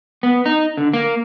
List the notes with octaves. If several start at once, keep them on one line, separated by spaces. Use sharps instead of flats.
B3
D#4
D3
A#3